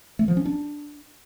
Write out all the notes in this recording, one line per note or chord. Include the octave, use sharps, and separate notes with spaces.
A3
F3
C#4
D4